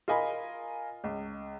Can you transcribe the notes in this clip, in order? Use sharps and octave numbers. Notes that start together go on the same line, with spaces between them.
F4 A#4 D#5 G#5 B5
C#2